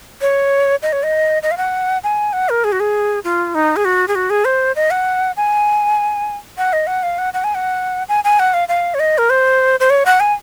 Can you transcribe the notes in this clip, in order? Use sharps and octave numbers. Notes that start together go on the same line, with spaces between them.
C#5
D#5
C#5
D#5
D#5
F5
F#5
G#5
F#5
A#4
G#4
F#4
G#4
F4
D#4
G#4
F#4
G#4
F#4
G#4
C5
D#5
F#5
G#5
F#5
D#5
F#5
F5
F#5
F#5
G#5
F#5
G#5
G#5
F#5
F5
F5
C#5
D#5
A#4
C5
C5
C#5
F#5
G#5